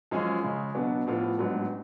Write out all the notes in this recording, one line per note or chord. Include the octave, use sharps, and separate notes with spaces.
F#2 F3 G#3 C#4 G#4
C#3 G#3 C#4
B2 F#3 B3 D4
A1 A2 F3 B3 F4
A1 G#2 F#3 B3 D4